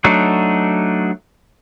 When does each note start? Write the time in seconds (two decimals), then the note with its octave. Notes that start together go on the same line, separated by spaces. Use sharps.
0.04 F#3 A3 D4 D#4 F#4